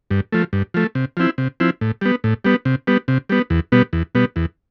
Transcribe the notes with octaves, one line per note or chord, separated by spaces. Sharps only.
G2
F3 A3
G2
F3 A3
C3
F3 C4 E4
C3
F3 C4 E4
A2
G3 B3
A2
G3 B3
C3
G3 B3
C3
G3 B3
E2
B2 G3 B3
E2
B2 G3 B3
E2